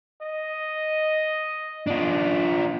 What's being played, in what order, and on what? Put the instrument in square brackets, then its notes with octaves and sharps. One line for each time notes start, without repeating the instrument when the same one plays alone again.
[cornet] D#5
[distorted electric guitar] D4 F4